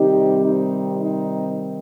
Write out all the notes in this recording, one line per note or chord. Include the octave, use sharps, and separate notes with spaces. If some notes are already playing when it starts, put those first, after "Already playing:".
Already playing: C3 D#3 G3 C4 D#4 G4
D#4
D#4